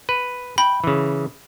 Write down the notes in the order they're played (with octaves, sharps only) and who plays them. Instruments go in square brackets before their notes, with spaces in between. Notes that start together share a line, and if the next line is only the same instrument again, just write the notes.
[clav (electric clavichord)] B4
[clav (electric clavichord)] G5 [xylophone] B5
[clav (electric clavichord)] C#3 E3